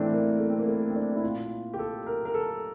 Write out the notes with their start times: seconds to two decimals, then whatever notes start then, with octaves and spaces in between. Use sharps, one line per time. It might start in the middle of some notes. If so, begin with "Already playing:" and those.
Already playing: A2 E3 A3 C4 D4
0.12 A#3
0.40 A3
0.50 C4
0.59 A#3
0.68 A3
0.90 C4
0.96 D4
1.16 E4
1.23 A#2 F4
1.74 G4
1.79 A4
2.07 A#4
2.25 A#4
2.34 A4